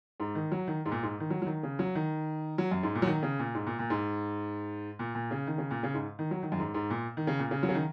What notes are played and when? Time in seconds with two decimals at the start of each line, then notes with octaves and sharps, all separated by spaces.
0.20 G#2
0.35 D#3
0.52 F#3
0.68 D#3
0.85 G#2
0.91 A#2
1.03 G#2
1.20 D#3
1.30 F#3
1.42 F#3
1.46 D#3
1.63 C#3
1.79 F#3
1.95 D#3
2.58 F#3
2.71 F#2
2.83 G#2
2.95 A#2
3.02 F#3
3.07 D#3
3.23 C#3
3.39 A#2
3.55 G#2
3.67 A#2
3.79 A#2
3.90 G#2
4.99 A#2
5.15 A#2
5.31 C#3
5.47 D#3
5.58 C#3
5.71 A#2
5.83 C#3
5.94 G#2
6.19 D#3
6.31 F#3
6.43 D#3
6.52 F#2
6.59 G#2
6.74 G#2
6.90 A#2
7.17 D#3
7.27 C#3
7.39 A#2
7.51 C#3
7.63 F#3
7.69 C#3
7.75 D#3